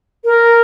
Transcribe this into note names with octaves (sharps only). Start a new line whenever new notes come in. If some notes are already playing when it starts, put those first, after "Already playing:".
A#4